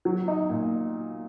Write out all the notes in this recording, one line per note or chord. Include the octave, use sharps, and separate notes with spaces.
F#3
D#4
A#2